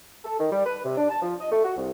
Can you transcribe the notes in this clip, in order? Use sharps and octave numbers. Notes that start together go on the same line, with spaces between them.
A4
D#3
G3
B4
C3
D4
A5
F3
D#5
A3
F#4
C2